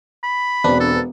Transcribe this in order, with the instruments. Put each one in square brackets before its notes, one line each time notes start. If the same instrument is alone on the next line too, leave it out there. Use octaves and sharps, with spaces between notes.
[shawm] B5
[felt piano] E1 [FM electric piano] C4 D4 B4
[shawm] A4